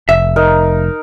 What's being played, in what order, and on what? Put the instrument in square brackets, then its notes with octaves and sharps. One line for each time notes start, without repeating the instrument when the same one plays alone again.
[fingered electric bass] F1 [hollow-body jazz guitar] E5
[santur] D#4 A#4